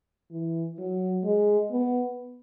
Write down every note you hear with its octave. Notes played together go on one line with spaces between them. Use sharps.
E3
F#3
G#3
B3